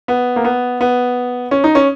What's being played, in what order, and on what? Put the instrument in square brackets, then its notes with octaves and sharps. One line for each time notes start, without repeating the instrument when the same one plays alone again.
[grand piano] B3
A#3
B3
B3
C#4
D#4
C#4